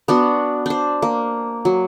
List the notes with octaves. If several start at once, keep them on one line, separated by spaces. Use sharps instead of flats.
B3 D4 F#4
D4 C5
A#3
F#3